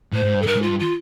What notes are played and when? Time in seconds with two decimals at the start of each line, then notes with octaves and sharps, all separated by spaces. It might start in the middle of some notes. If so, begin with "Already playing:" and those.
0.13 A2 C5
0.24 G#2
0.35 G2
0.42 A4
0.46 G2 A#4
0.57 G#2
0.62 F4
0.67 G2
0.79 F4